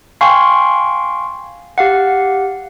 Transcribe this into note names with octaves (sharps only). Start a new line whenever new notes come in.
F5 G5 G#5 C6 C#6
G4 F5 F#5